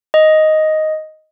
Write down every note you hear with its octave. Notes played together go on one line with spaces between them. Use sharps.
D#5